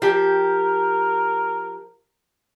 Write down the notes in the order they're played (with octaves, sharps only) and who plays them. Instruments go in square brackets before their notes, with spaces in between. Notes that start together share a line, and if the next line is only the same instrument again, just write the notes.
[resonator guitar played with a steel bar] F3 G4 [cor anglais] A#4